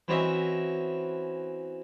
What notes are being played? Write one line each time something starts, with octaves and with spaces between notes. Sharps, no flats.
E3 C4 C#4 F#4 D#5 E5